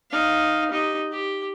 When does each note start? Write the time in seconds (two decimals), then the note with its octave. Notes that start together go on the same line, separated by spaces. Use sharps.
0.10 D#4 F5
0.71 D#4 G4
1.11 G4